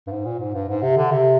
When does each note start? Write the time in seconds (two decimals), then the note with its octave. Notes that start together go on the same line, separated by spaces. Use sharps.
0.07 G2
0.12 G#2
0.25 A#2
0.40 G#2
0.54 G2
0.69 G#2
0.82 C3
0.97 D3
1.11 C3